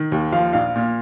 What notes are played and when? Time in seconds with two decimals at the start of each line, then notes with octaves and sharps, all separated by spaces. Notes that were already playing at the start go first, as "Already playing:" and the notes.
Already playing: D#3
0.12 D#2
0.32 F3 F5
0.53 A#1 F5
0.76 A#2